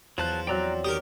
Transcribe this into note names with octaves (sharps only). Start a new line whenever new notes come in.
E2 F3 F#3 A5 F#6
F#3 C4 D5 G5 A#5 F#6
D#3 G4 A#4 D#6